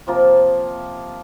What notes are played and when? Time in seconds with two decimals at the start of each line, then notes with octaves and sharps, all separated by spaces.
0.07 C3 F3 A#3 F4